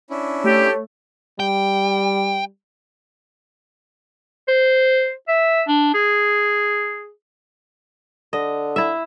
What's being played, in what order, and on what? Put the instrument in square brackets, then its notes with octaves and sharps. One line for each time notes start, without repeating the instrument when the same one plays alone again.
[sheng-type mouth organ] C#4 D4 E4
[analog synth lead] A3 [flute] G4 [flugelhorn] C#5
[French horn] G3 [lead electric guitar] G5
[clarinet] C5
E5
D4
G#4
[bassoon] D3 [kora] D#5
[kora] E4 E5